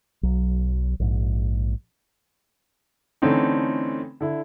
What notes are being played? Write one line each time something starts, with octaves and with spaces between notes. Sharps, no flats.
B1 F#3
A#1 G#2
D3 E3 A3 C4 C#4 D#4
D3 E4